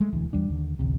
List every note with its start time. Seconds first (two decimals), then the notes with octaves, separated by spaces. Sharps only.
0.01 G#3 A3
0.13 E1 D2 E3
0.33 E2 G3 D4
0.50 D#2 D3
0.79 A1 D2 C3